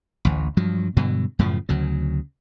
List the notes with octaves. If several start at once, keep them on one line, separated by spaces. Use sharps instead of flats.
A1 D2
G2 F3 F#3
G2 B2 D3 F#3
F#2 A2 C#3 F3
D2 C#3 F#3